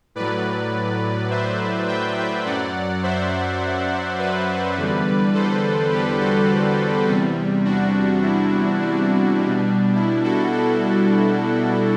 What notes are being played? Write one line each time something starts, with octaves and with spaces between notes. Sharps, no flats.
A2 F#3 B4 D5
C5 E5
E5 G5
E5 G5
F#2 F#3 D5 F#5
C5 E5
B4 D5
E2 D3 G3
A4 C5
G4 B4
F#4 A4
E2 C3 G3
D4 F#4
E4
D4
B2 G3
E4
F#4 A4
F#4 A4